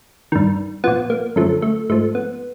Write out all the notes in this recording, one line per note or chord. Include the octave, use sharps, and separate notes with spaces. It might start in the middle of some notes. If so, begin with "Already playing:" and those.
G2 D#3
A#2 F3 B3
A#3
F#2 D3 F3 A3
A3
G#2 F3 A3
B3